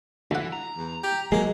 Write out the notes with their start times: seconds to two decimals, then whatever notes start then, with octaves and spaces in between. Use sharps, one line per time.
0.31 D2 E3 F#5
0.52 A#5
0.77 E2
1.03 G4
1.32 F#3 G#3 A#3 G#4